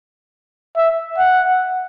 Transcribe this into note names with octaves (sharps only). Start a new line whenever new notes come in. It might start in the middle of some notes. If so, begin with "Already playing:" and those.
E5
F#5